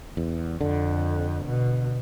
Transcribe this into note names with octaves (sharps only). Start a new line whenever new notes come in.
E2
F2 D3
B2